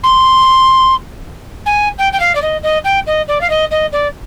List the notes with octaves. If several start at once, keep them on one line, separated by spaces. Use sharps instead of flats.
C6
G#5
G5
G5
F5
D5
D#5
D#5
G5
D#5
D5
F5
D#5
D#5
D5